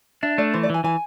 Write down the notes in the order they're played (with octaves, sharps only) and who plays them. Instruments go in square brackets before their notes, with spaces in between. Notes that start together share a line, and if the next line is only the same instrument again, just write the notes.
[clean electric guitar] D4 [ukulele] E5
[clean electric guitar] A3 [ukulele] D5
[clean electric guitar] E3 [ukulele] C5
[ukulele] D5
[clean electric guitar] E3 [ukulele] G#5
[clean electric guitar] E3 [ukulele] G#5